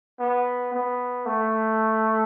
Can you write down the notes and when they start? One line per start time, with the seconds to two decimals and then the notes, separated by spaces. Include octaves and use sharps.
0.20 B3
0.74 B3
1.26 A3